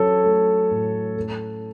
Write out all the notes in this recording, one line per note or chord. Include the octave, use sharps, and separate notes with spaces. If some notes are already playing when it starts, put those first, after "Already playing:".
Already playing: F#3 C#4 A4 C#5
A3
A2
A3